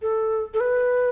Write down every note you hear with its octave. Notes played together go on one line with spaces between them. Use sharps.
A4
A4
B4